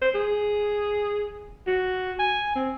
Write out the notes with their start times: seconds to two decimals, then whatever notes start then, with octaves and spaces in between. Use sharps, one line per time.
0.01 C5
0.15 G#4
1.67 F#4
2.19 G#5
2.56 C4